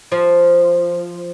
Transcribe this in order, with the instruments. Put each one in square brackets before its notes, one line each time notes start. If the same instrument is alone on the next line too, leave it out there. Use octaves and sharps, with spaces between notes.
[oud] F3